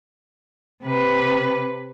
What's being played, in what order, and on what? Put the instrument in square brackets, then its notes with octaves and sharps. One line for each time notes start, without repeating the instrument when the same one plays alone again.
[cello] C3 B4